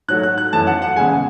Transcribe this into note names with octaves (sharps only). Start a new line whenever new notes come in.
G#2 F#3 A3 F#6
F#6
F#6
F#2 E3 A3 A5
F#5
F#5
E2 C#3 G#3 G#5